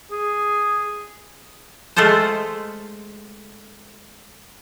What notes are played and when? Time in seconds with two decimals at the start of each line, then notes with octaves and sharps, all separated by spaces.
0.11 G#4
1.96 G#3 A3 F4 A4 C5